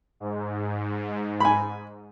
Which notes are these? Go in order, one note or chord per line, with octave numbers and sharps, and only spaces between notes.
G#2
G#5 B5